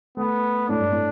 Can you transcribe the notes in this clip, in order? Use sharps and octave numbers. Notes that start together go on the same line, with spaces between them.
A3 B3
A2 D4
G2
A2